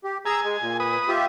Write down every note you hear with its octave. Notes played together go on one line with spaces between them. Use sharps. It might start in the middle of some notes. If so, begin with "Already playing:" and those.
G4
G#4 G#5 A#5 E6
G#3
A#2
B4 D#6
F4 G4 E5